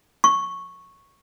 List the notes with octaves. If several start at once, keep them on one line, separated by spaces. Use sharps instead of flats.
C#6